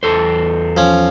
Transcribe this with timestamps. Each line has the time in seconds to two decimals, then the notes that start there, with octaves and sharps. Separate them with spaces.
0.03 E2 A4 C5
0.77 F3 C#4